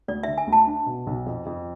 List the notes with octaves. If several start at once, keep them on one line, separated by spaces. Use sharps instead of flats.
D2 D5
E5
D3
G#5
D2
A5
D4
B2
B1
F2
F2